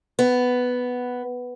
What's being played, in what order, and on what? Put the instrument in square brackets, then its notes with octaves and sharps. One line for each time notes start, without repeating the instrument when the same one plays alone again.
[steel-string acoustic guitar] B3